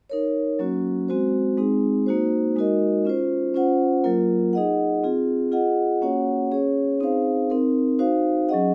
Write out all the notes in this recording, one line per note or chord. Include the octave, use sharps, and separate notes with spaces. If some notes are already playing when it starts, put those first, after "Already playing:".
D#4 A#4 C#5
F#3 A#3 C#4 F#4
G#3 C4 F#4 C5
G#3 C4 D#4 G#4
A#3 D#4 F#4 C5
G#3 D#4 F#4 A#4 D#5
C#4 F4 C5
C#4 F4 C5 F#5
F#3 A#3 F4 A#4
D#4 G#4 D#5 F#5
C4 F4 G#4
F4 G#4 D#5 F#5
A#3 C#4 F#4 C#5 F#5
C#4 G#4 C#5
C4 D#4 G#4 C5 F5
C4 D#4 A#4
D#4 F#4 C5 F5
F#3 C#4 G#4 D#5 F#5